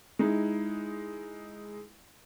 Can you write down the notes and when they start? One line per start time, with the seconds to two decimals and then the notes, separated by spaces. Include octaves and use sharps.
0.19 G#3 D#4 E4